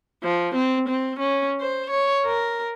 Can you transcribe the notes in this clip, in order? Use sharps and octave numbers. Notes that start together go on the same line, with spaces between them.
F3
C4
C4
C#4
C5
C#5
A#4